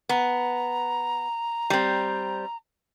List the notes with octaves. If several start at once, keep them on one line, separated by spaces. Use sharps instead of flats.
B3 A#5
G3 C4